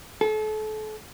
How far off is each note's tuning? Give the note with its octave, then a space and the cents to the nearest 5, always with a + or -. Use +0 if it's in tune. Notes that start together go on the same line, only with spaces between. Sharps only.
A4 -35